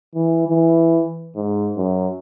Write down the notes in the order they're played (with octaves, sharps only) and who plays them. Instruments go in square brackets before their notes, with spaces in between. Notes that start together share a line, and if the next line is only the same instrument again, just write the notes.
[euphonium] E3
E3
G#2
F#2